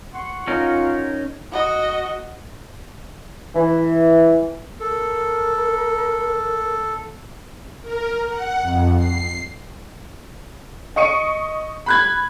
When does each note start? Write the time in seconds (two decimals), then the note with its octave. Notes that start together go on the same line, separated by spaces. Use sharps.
0.14 F#5 C6 C#6
0.48 C#4 D#4 F4 A#4
1.51 F#4 D#5
3.55 E3
4.80 A4 A#4
7.82 A#4
8.29 F#5
8.61 F2
8.96 C7
10.96 D#5 C#6 C#7 D#7
11.86 B5 F#6 G#6